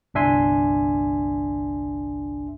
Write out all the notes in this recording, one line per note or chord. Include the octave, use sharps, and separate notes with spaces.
G1 C2 D4 E5 G#5 C6